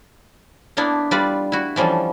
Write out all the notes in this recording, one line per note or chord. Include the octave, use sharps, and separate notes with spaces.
A#3 B3 D4 E4
G3 F4 B4 D5
E4 F#4
E3 F3 G3 C#4 A4